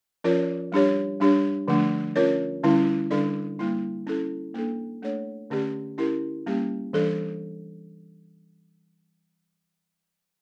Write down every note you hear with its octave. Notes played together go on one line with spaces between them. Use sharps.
F3 C#4 F4 A#4 C#5
G3 D4 G4 C#5
G3 D4 G4 C#5
D3 F3 A3 D4
C#4 F4 A#4 C#5
D3 G3 C#4 E4
D3 G3 D4 A4 D5
G3 A#3 E4
C#4 E4 A4
A#3 D4 A4
A3 D4 A4 C#5
D3 A3 C#4 G4 D5
C#4 E4 G4 A#4
G3 A#3 C#4 G4
E3 G3 D4 A4 D5